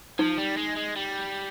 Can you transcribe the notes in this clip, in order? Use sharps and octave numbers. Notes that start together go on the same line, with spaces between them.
F3 D#4
G3
G#3
G#3
G3